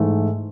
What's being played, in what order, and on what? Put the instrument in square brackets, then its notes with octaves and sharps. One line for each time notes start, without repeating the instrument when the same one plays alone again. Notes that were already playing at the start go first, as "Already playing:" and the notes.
Already playing: [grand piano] G#2 E3 A3